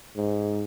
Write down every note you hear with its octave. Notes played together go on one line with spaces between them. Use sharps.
G#2